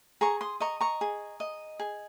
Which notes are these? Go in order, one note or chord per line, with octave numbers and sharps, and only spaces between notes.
G#4 A#5 C#6
C6 D#6
D#5 A#5 C#6
A#5 C#6
G#4
D#5
G#4